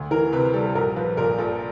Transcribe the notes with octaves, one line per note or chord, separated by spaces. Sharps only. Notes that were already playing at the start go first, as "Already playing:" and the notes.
Already playing: D2
E3 A#4
C3 B4
G3 A4
A#1 A#4
F3 B4
A#2 A#4
A#1 A4